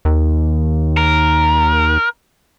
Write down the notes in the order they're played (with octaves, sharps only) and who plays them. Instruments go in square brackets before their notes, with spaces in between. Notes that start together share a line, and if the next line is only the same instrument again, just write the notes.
[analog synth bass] D#2
[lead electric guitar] A#4